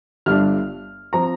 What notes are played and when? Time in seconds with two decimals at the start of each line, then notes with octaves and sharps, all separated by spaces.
0.26 G1 G2 G3 D4 F6
1.13 F3 C4 A#5